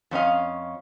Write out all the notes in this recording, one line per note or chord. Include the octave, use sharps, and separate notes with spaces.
F2 C#4 D#5 F5